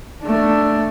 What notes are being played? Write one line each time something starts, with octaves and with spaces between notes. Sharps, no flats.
A3 D4